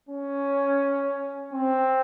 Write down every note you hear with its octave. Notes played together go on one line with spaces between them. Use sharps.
C#4
C4